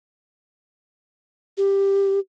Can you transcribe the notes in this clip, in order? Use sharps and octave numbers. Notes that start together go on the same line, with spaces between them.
G4